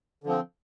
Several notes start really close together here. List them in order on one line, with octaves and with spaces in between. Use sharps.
D3 F3 C4